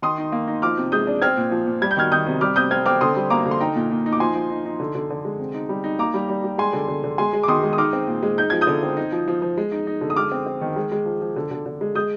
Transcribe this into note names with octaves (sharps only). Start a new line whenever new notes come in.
D#3 C6 D#6
D#4
A#3
D#4
F3 D6 F6
C3
G#3 D#6 G6
D4
C4 F6 G#6
A#2
F3
A#2
G3 G#6
G6
D#3 F6 G#6
D#3 D#6 G6
C3
G3 D6 F6
C3 D#6 G6
C4 F6 G#6
C4 D6 F6
D3 C6 D#6
G3
A#3 A#5 D6
D3
C6
D#4 G5 A#5
A#2
A#2
D#4
D6
F3 G#5 C6
F3
D#4
D#4
D3
D3
D3
G#3
C3
D#4
G3
D#4
A#3 A#5 D6
G3
G3
G3
G#3 G#5 C6
D3
D3
D3
G#3 G#5 C6
G#3
D6
D#3 C6 D#6
G#3
D#6
D#4 D6 F6
C4
A#2
G#3
D#4 G6
F3 G#6
D#6 G6
D3
C4
D#4
F3
F3
F3
G#3
D#4
D#4
D3
D#6
G#3 D6 F6
C4
C4
D#3
G#3
G#3
F3
F3
D3
D3
D3
G#3
G#3 D#6 G6